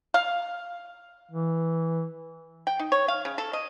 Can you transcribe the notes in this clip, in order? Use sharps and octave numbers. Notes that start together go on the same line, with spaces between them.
F5
E3
G5
D#4
C#5
F5
C#3
A4
D#5